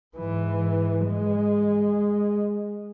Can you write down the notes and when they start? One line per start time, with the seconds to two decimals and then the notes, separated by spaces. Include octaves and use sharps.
0.16 G#2 E3
1.07 G#3